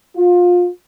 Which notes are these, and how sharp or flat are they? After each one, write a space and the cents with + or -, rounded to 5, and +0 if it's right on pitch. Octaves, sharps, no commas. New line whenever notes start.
F4 +25